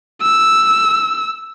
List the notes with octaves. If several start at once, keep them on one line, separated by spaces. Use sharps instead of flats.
E6